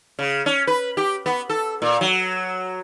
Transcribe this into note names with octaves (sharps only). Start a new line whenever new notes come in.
C#3
C#4
B4
G4
B3
A4
A#2
F#3